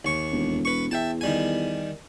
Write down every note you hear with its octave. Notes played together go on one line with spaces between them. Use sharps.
D#2 C#6
E1
B4 C#6
E2 E5 G5 A5
D#3 G3 G#5